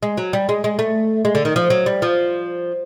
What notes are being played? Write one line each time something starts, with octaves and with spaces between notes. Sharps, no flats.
G#3
F#3
G3
G#3
G#3
A3
G#3
D3
D#3
F3
F#3
G3
F3